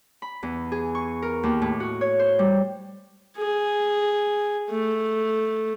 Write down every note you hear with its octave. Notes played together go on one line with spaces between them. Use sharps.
B5
E2
G#4
C#6
A#4
D#2
A2
F#4
C#5
C5
G3
G#4
A3